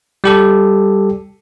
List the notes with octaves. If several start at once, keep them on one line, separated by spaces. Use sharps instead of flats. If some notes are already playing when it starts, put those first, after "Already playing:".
G3 G4 A4